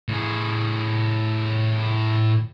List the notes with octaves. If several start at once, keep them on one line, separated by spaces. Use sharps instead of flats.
A2 G#4